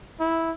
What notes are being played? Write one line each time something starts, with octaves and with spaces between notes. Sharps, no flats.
E4